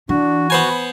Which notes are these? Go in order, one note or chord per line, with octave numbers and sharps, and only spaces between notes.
E3 D4 F#4
B3 C5 G#5 B5